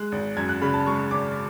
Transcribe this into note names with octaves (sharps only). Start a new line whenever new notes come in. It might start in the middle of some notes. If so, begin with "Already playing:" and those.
Already playing: G#3 F#6
G#1
F#2 G#6
F#6
C#3 B5
A5
G#3 C#6
G#1 D6